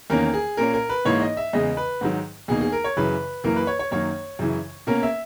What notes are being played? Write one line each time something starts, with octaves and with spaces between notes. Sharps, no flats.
E2 D#3 A#3 C#4 A#4
G#4
A#2 A#3 C#4 A#4
A#4
B4
G#2 E3 A#3 D#4 C#5
D#5
E5
E2 C#3 G#3 D#5
B4
G#2 D#3 F#3
E2 B2 A#3 D#4 G#4
G#4
A#4
C#5
F#2 C#3 E3 B4
F#2 E3 A#3 A#4
B4
C#5
C#5
F#2 D#3 A#3 C#5
F#2 C#3 E3
B2 A#3 C#4 A#4
E5